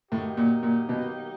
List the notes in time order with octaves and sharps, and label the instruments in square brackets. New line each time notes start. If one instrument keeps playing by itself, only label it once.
[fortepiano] A2 [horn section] D#3 F#3 A#3 D#4 G4
[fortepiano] A#2
A#2
B2